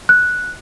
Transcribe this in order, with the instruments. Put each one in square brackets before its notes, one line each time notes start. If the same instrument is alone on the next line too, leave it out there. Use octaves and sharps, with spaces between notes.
[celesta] F#6